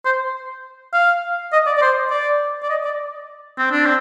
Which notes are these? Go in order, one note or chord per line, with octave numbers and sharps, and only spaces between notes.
C5
F5
D#5
D5
D5
C5
D5
D5
D#5
D5
C4
D4
C4